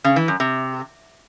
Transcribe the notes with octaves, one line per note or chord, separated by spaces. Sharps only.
C#3
E3
F#2
C3